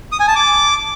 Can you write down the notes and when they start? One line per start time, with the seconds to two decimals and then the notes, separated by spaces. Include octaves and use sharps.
0.12 D#6
0.20 G#5
0.28 A5
0.35 D6